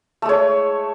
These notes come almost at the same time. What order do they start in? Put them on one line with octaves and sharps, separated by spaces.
A3 G#3 C#5